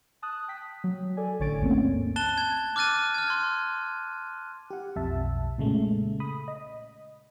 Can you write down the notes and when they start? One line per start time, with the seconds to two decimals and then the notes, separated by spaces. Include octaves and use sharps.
0.22 A5 D#6 F#6
0.48 G5 B6
0.84 F#3
1.17 A4 D5 G#5
1.40 A1 D3 C#5 G#5 A6 D7
1.61 D#2 G#2 A3 A#3 C4 C#4
2.16 A5 F#6 A6 E7 G7
2.38 G#6
2.76 D6 F6 F#6 A6 D#7
3.14 F6 G#6
3.30 C6
4.70 G4 F#5
4.96 B1 F2 E5 A5
5.58 A#2 C#3 G#3 A3
6.20 B5 D#6
6.48 D#5